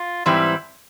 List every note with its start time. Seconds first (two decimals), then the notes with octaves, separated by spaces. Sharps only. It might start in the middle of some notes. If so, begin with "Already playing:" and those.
Already playing: F4
0.26 G#2 E3 G3 C4 E4